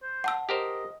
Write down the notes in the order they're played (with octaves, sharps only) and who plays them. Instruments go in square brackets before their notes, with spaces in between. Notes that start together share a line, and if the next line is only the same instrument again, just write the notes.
[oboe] C5
[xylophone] F#5 A5 E6
[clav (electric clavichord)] G4 A#4 C5 [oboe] D#5